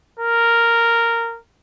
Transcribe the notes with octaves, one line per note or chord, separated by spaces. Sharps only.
A#4